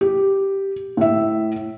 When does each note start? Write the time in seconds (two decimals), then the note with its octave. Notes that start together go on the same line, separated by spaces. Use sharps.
0.01 G4
0.97 A2 E5